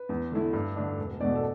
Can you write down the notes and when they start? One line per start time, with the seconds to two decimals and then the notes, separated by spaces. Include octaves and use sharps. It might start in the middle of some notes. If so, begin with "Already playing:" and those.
Already playing: B4
0.09 E2
0.32 D3 A3 E4
0.53 G2
0.76 D3 A3 D4
0.98 E1
1.20 E2 B2 A3 D5
1.35 A4